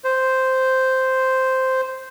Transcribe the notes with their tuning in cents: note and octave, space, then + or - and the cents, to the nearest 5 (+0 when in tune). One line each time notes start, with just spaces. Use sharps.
C5 -5